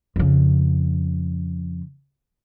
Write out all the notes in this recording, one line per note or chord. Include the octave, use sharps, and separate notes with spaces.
F2 C#3